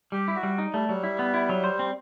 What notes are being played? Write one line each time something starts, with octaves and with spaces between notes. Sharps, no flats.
G3 G4
E4
F#4
G3
D#4
G3 A3
F#3 G3
E4
B3
E4
F#3
C5
C4